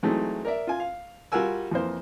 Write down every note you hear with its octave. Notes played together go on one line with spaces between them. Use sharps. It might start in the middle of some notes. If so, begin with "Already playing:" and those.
E3 F#3 G#3 A3 C4 D#4
A#4 D5 E5
F4 G#5
F5
G3 F4 F#4 A#4 G#5 E6
F2 E3 A#3 C5